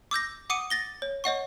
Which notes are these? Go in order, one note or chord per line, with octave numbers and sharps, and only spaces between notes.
D6 E6 G6 A#6
F#5 D6 D#6 C#7 D#7
A6 A#6 G7
C#5
C#5 D#5 F#5 C#6